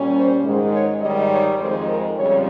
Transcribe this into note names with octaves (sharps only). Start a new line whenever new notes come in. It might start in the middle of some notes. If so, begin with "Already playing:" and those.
Already playing: A#2 G3 C#4
C5
G#2 D#3 G#3
C#5
G#2 D#3 G3 D#5
C#5
F2 D#3 G#3 C5
A#4
F2 C#3 G3 C#5